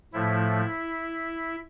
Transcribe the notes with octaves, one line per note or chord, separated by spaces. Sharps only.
A2 F3 A3 E4